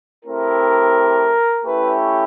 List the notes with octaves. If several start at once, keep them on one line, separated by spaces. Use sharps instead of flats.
A3 C4 E4 G4 A#4
A3 C#4 E4 G4 B4